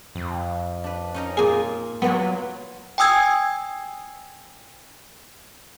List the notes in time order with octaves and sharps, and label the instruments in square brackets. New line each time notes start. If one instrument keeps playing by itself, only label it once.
[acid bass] F2
[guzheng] D4 B4
C#4 D#4 A#4
[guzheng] A#2 A#3 F4 [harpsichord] G#4 G#5
[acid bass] F#3 [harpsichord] B3 [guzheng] F4 B4 D5
[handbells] G5 G#5 D#6 E6 G#6